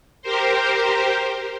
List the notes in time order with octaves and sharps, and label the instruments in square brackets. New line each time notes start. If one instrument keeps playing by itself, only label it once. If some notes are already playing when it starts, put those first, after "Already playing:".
[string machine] G4 A#4 C5